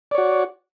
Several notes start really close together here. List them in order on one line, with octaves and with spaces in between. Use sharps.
D5 C#5 F#4